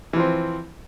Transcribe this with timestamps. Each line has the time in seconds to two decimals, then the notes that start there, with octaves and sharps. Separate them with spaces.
0.13 E3
0.16 F3
0.20 C4